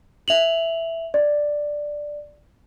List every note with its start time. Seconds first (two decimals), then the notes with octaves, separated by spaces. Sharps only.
0.28 E5 F7 F#7
1.14 D5